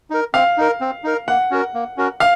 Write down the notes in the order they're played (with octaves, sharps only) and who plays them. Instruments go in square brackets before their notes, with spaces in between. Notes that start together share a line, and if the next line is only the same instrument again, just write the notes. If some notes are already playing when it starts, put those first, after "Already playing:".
[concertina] D#4 A#4
[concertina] C4 [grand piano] F5
[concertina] D#4 A#4
C4
D#4 A#4
[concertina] A#3 [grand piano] F#5
[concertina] C#4 F#4 A#4
A#3
C#4 F#4 A#4
[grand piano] F5